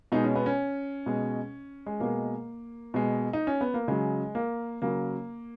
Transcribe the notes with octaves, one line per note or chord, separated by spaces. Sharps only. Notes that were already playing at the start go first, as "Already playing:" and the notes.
B2 G#3 D#4
C#4
B3
C#4
B2 G#3
G#3
B2 G#3 A#3
B2 G#3
D#4
C#4
B3
A#3
C#3 F#3 G#3
A#3
C#3 F#3 A#3